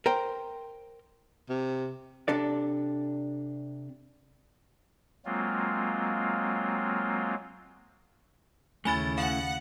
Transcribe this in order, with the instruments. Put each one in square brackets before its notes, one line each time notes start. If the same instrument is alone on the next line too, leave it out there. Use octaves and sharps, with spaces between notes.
[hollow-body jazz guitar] A#4 C5 G5
[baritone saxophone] C3
[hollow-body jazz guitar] C3 D4 A4 D5
[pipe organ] F#3 G#3 A#3 C4 F4
[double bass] D#2 C#3 [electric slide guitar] A3 C#4 E4 [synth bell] G#5 B5 A6
[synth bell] F5 [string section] F#5